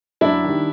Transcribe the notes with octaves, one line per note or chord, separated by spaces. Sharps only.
F#2 D4 E4
D#3 G3